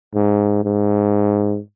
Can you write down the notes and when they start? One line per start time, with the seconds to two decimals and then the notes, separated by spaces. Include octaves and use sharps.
0.15 G#2
0.64 G#2